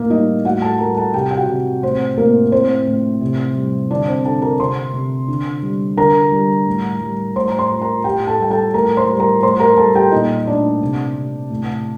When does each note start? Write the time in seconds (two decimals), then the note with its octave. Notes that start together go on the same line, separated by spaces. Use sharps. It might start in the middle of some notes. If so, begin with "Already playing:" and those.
Already playing: A2 A#3 A#4
0.10 G3 D#4 D#5
0.45 A2 F#4 F#5
0.62 A4 A5
0.79 G3 A#4 A#5
0.97 A4 A5
1.14 C3 G4 G5
1.31 G5
1.37 F#4 F#5
1.48 C3
1.83 A2 C4 C5
2.17 A2 A#3 A#4
2.52 A2 C4 C5
2.87 A2
3.21 C3
3.55 G3
3.91 D3 D4 D5
4.08 C4 C5
4.24 D3 A4 A5
4.42 A#4 A#5
4.60 C3 C5 C6
4.93 C3
5.28 D3
5.63 G3
5.97 D3 A#4 A#5
6.32 G3
6.67 A2
7.02 G3
7.36 A2 C5 C6
7.48 A#5
7.58 C5 C6
7.70 A3
7.82 A#4 A#5
8.04 A2 G4 G5
8.27 A4 A5
8.40 G3 G5
8.51 A4 A5
8.74 A2 A#4 A#5
8.97 C5 C6
9.08 G3
9.20 A#4 A#5
9.42 A2 C5 C6
9.60 A#4 A#5
9.77 G3 A4 A5
9.95 G4 G5
10.12 A#2 D#4 D#5
10.47 A3 D4 D5
10.81 C3
11.16 C3
11.50 A2